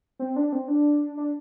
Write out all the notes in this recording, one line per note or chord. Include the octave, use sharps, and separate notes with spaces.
C4
D4
C4
D4
D4